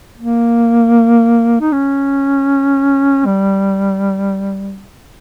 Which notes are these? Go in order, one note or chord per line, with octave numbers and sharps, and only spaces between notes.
A#3
D#4
C#4
G3